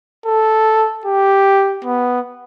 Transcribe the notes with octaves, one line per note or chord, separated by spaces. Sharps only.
A4
G4
B3